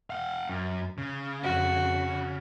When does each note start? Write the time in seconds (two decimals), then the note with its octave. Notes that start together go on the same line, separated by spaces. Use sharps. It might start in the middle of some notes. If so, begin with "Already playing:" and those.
0.10 F5 F#5
0.49 F#2
0.98 C#3
1.43 F2 F#4